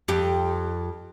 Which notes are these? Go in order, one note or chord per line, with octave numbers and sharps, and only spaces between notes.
F2 G4